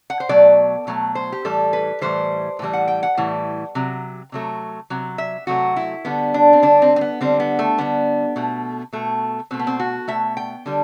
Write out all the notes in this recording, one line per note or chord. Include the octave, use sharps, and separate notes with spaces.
F#5
C5
B2 F#3 A3 D5
B2 F#3 A3
C5
G4
A2 E3 G3 A4
B4
A2 E3 G3 C5
A2 E3 G3
F#5
G5
F#5
A2 E3 G3
C3 F#3
C3 F#3 A3
C3 F#3
E5
C3 F#3 A3 F#4
E4
D3 G3 B3
D4
C4
D3 G3 D4
C4
C4
B3
D3 G3 C4
B3
A3
D3 G3 B3
B2 A3
B2 A3
B2 A3 C4
B3
C4
F#4
B2 A3 E5
G5
D3 G3